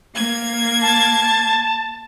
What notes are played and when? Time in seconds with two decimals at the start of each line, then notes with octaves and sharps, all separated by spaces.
0.14 A#3 G#6
0.82 A5